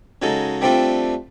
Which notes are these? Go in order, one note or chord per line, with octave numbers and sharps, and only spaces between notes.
C#3 F#3 G#3 D#4 A4
G3 A3 C4 D4 F4 A4